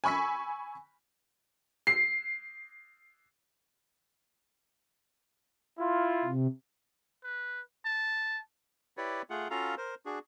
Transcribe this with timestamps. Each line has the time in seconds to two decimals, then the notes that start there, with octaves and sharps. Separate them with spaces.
0.04 G#5 B5 C#6 E6 B6
1.87 C7
5.79 E4 F4
6.25 C3
7.24 B4
7.85 A5
8.97 E4 G4 B4 C#5 D5
9.30 A3 F4 G#4 F#5
9.51 C#4 F4 F#4 A4 F5 A#5
9.77 A#4 C5
10.06 D4 F#4 G#4